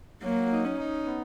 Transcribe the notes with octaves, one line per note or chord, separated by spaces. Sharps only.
F#3 A#3
D#4
C#4
D#4
B3